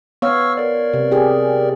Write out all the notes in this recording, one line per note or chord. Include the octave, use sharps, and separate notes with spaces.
B3 C#5 F5 C#6 E6 F6
A#4 D5
C3
G4 G#4